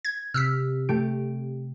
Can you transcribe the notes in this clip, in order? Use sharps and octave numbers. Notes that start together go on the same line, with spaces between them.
G#6
C3 E6 F6 B6
A3 G4 D7